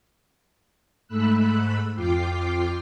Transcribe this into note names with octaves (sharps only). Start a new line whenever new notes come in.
G#2 A3 B5 E6 F#6
F2 F4 G5 D6 C7